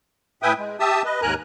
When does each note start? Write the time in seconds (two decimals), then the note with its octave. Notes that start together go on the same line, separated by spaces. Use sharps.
0.43 A2 B4 E5 G5 G#5 D#6
0.58 G#3
0.80 G4 E5 A5 D#6 E6
1.05 B4 D#5
1.22 D#2 G#2 A#4 G#5 A#5 F#6